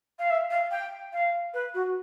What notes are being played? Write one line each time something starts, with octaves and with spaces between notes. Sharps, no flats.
F5
E5
F5
G5
F5
B4
F#4